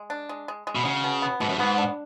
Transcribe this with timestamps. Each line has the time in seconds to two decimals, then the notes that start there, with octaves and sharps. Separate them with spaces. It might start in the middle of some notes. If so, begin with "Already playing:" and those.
Already playing: G#3
0.10 D4
0.29 G#3
0.48 G#3
0.67 G#3
0.75 B2
0.85 C#3 F#3
1.04 B2
1.22 B3
1.40 G#2 B2
1.49 F#2
1.58 G#2 B3
1.78 D4